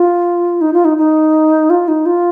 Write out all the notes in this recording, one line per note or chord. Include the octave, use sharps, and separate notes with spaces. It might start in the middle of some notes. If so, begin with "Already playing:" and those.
Already playing: F4
D#4
F4
D#4
D#4
F4
D#4
F4